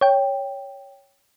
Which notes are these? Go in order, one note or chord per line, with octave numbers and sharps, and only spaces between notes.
C#5 G5